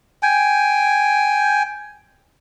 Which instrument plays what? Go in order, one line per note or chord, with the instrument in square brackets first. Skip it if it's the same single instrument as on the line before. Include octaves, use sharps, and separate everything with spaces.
[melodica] G5 G#5